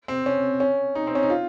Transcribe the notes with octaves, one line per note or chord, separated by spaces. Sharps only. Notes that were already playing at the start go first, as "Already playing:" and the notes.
C4
C#4
C#4
D#4
C4
C#4
D#4
F4